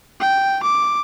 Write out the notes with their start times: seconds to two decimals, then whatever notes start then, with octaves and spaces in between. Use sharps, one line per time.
0.21 G5
0.63 D6